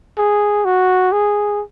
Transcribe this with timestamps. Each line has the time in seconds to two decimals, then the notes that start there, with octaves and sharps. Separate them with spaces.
0.18 G#4
0.65 F#4
1.12 G#4